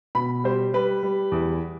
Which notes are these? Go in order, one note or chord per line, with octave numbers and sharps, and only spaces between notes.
B2 B5
G3 C5
G3 B4
G3
E2